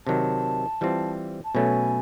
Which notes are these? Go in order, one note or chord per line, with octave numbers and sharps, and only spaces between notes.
C3 D#3 F#3 A5
E3 G3 C4 F4
A5
B2 F#3 A3 C#4 G#5